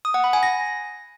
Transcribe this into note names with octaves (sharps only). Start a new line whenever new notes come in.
D#6
F#5
B5
G#5
A#6